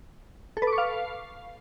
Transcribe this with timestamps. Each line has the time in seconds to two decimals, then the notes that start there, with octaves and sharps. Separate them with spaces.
0.57 A4
0.62 B4
0.67 D6
0.73 C#6
0.78 F5